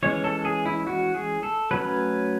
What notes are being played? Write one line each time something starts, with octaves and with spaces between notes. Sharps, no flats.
E3 G#3 C#4 C#5
A4
G#4
E4
F#4
G#4
A4
F#3 A3 C#4 B4